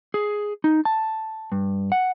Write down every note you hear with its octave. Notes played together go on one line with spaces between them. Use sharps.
G#4
D#4
A5
G2
F#5